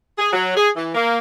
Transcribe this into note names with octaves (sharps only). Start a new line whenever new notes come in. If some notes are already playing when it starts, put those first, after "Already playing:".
G#4
F#3
G#4
E3
A#3